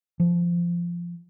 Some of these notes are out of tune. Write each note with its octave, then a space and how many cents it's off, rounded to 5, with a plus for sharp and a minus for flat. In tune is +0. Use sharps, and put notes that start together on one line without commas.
F3 -15